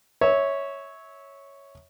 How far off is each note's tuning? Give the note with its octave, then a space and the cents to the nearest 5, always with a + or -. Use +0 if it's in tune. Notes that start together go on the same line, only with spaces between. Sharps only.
C#5 +0 E5 -20